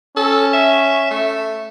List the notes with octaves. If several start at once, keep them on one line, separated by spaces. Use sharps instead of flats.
C#4 A4
E5
A3